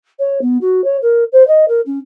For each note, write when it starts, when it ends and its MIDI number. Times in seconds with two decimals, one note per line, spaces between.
0.19 0.39 73
0.41 0.57 59
0.61 0.84 66
0.84 0.97 73
1.02 1.24 70
1.32 1.45 72
1.47 1.65 75
1.68 1.80 70
1.86 1.98 61